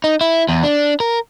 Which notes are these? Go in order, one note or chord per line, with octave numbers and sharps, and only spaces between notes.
D#4
E4
E2
D4
A#4